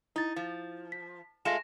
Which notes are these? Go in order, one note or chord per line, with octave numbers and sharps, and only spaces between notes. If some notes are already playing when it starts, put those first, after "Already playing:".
D#4 E4 A6
F3
B6
G#3 A3 F4 A#6 E7